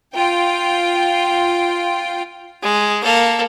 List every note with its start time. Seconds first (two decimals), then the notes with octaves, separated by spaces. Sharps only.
0.14 F4 G5
2.63 G#3
3.03 A#3 A4